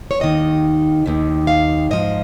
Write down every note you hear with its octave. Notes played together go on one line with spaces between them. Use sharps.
C#5
D#2 D#3 D#5
D#2 D#3
F5
G#2 F3 D#5